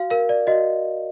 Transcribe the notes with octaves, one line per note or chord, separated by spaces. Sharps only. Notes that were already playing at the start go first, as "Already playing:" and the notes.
Already playing: F#4 F5
A#4 F5
D5
F#4 D#5